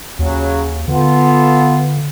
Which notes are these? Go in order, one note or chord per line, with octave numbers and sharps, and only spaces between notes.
D#2 C#3 F#3
D3 B3 F4 A4